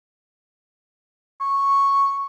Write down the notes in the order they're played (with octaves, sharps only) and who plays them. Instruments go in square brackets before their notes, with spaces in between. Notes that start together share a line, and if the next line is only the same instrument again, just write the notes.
[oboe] C#6